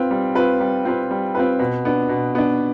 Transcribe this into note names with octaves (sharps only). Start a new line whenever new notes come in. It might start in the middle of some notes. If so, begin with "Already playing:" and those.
Already playing: C4 F4 B4
G3
C4 F4 B4
G3
C4 F4 B4
G3
C4 F4 B4
B2
B3 D4
B2
B3 D4